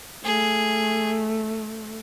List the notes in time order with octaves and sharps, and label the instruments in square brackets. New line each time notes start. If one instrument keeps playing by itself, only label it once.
[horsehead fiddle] A3 [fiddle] G#4